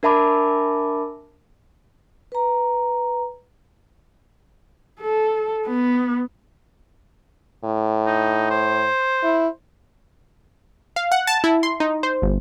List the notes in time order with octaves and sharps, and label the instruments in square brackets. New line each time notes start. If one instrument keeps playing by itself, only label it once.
[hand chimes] D4 A#4 E5 A5 B5 D6
[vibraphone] B4 A#5
[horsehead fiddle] A4
B3
[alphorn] A2
[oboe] D#4
C5
[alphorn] E4
[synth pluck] F5
F#5
A5
E4
C6
D#4
C5
G1